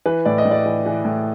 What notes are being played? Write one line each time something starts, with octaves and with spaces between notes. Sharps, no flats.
E3 B4
A2 D5
D#5
A2
D5
E3
E3
A2